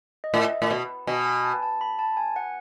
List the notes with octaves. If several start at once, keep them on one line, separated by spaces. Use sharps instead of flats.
D#5
A2 E5
A2
B2
B2 G#5
G#5
A5
A5
B5
A5
G#5
F#5